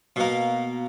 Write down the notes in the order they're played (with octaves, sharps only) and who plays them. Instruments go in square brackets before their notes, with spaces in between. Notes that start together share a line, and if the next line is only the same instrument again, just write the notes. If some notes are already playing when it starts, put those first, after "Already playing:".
[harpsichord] B2 A#3